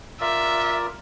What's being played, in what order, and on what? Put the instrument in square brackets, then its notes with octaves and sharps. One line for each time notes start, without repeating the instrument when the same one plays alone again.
[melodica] F4 A#4 D5 [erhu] E5